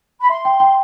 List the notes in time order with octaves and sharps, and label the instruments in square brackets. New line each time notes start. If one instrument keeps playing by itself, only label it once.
[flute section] B5
[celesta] E5 [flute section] C6
[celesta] G5
G5